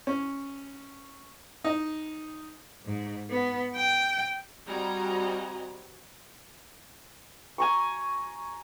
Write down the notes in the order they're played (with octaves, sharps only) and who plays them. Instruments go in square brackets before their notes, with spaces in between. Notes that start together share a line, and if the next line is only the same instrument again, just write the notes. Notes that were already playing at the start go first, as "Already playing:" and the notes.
[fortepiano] C#4
D#4
[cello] G#2
B3
G5
[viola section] G3 C4 F#4 D#5 G#5 A#5
[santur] G#5 A#5 C#6